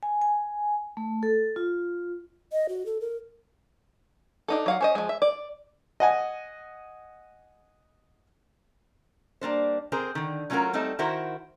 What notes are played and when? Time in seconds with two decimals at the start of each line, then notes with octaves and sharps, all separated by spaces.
0.03 G#5
0.22 G#5
0.97 A3
1.23 A4
1.56 F4
2.52 D#5
2.69 F#4
2.86 A4
3.01 A#4
4.48 D4 D#4 A4
4.66 F#3 F5 F#5
4.81 C#4 C5 D#5
4.95 F3 G#3
5.09 E5
5.22 D5
6.00 D#5 F#5 G#5
9.41 G3 A#3 D4 C5
9.92 C4 G#4 A#4 C5
10.15 D3 D#3
10.50 F#3 A3 C#4 F4 F#4 A#4
10.73 G3 A3 C4 D#4 A4
10.99 D#3 E4 F#4 A#4 C5